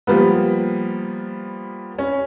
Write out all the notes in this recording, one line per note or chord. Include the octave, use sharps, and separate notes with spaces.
F3 G3 A#3 B3
C#4